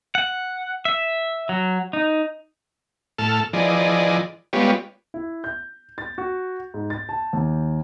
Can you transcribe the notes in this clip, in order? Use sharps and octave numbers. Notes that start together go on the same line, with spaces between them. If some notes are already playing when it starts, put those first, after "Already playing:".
F#5
E5
F#3
D#4
A2 A4 A5 F6
E3 F3 G#4 D5 D#5
G3 G#3 B3 F4 G4 C#5
E4
G6
A6
F#4
G#2
A6
A5
D#2